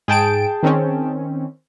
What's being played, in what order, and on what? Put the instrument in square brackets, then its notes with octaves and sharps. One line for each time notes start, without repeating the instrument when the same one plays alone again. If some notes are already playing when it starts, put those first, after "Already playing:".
[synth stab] G#2 D7 [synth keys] G#4 G5 A5
[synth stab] D#3 C4 C#4